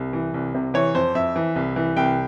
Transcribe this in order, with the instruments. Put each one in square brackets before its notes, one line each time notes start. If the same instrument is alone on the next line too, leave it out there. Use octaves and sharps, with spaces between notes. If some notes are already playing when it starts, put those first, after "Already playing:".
Already playing: [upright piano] C2
E3
C2
C3
E3 C#5
F2 C5
F2 E5
E3
C2
E3
C2 G5